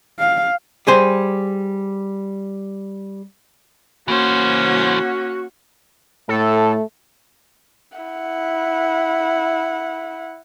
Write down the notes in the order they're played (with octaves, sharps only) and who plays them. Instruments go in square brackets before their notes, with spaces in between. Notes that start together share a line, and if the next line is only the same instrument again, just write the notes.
[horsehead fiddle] F5
[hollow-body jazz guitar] G3 G#4 C5
[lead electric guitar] E3 C5 [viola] A#3 C#4 [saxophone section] F#4
[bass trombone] A2 [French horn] A3 [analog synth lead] A4
[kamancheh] E4 F#5